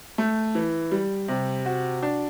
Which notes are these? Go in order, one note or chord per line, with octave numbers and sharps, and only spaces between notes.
A3
E3
G3
C3
F#4
D4